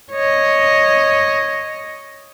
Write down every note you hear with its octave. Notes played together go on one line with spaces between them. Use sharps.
C#5 D#5